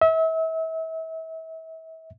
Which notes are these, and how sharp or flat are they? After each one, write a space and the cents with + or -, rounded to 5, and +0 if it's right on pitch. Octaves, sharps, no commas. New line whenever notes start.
E5 -35